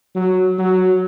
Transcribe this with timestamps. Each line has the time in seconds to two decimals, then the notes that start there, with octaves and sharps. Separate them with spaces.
0.15 F#3
0.58 F#3